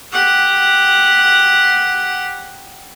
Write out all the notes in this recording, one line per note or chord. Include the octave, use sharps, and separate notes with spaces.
G4 F#5